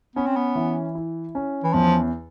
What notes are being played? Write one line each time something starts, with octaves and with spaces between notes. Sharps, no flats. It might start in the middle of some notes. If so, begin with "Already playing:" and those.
B3 C#4
C4
B3
E3
E4
C#4
E3
E2 F3